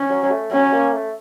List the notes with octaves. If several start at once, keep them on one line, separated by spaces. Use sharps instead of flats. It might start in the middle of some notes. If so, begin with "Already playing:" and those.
Already playing: C#4
F#3
F#3
A3
F#3 C#4
A#3
A3